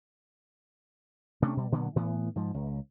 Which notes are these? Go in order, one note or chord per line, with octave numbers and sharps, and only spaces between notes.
C3 A3 C#4 D4
B2 G3
A#2 D3 F#3 B3
A2 E3 B3
G#2 F3
C#2